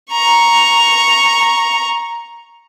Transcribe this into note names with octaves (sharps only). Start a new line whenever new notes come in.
A#5 C#6